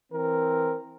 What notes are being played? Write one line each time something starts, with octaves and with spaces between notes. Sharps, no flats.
E3 C4 A#4